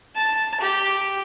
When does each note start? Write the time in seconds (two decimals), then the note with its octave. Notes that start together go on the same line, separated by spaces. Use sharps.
0.15 A5
0.60 G4